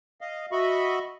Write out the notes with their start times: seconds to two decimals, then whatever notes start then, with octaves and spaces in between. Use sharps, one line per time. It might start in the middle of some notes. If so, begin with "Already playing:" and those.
0.21 D#5 F5
0.52 F#4 D#5 E5 B5 C#6